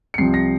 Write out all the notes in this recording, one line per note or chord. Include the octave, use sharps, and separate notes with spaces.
C#7
C2 C3 F3 C4 C7
A#6